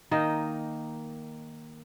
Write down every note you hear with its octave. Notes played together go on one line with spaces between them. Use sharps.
D#3 A#3 D#4 D#5